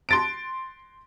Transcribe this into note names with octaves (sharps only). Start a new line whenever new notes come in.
C6 A6 D7